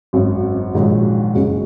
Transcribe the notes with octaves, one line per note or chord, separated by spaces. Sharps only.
G#1 F#2 F#3
A#1 G#2 D#3 F#3
F#1 F#2 C#3 G#3 F#4